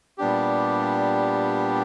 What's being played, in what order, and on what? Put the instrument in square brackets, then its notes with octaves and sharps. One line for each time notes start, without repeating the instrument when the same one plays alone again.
[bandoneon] A#2 G3 B3 D4 G4